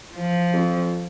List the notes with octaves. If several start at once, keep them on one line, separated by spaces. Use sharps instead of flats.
F3
F2